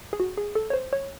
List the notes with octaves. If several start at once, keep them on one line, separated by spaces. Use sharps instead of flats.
G#4
F#4
G#4
A4
C#5
C5
C#5